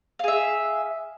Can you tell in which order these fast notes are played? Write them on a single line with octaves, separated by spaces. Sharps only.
F5 G#4 E5